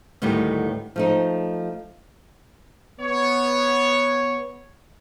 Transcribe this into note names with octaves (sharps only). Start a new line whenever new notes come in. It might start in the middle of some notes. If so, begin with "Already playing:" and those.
D2 A2 D#3 G3 B3 G4
F3 A3 D#4
B3 C#5